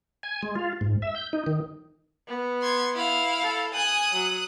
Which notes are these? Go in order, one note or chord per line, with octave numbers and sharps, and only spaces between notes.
G#5
G#3
F4
G#2
E5
G6
D#4
D#3
B3
C6 G#6
E4 F5
A4
G#5 D#6 F#6
F#3